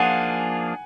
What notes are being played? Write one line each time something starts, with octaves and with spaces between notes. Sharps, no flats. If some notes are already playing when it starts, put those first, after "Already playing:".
Already playing: F3 A#3 D4 F4 G#4 F#5 G#5